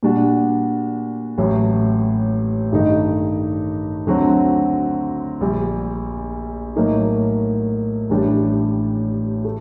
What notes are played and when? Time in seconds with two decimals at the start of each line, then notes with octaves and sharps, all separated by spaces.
0.03 A#2 G3 D4 F#4
1.38 A1 A2 F#3
2.72 G2 D#3 A3 D#4
4.07 D2 D3 F#3 C4 F#4
5.41 A#1 A#2 G3
6.76 A2 F#3 A#3 D#4
8.10 A1 A2 G3 D4
9.45 A3